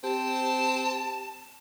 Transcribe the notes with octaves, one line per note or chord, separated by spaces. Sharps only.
C4 G4 A5